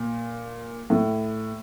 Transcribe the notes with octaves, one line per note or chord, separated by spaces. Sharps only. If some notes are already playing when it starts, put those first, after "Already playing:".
Already playing: A#2
A2